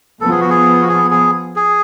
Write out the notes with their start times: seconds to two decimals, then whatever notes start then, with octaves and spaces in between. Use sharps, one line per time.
0.21 F3 B3 A4
0.31 G#4
0.40 F#4
0.50 G#4
0.82 F#4
0.88 G#4
1.11 G#4
1.56 G#4